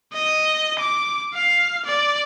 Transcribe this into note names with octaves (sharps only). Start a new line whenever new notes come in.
D#5
D6
F5
D5